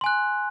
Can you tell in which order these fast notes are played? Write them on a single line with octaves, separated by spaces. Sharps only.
C6 G#5 F#6